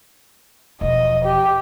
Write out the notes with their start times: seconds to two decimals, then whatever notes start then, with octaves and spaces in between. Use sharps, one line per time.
0.81 E1 F3 D#5
1.24 G4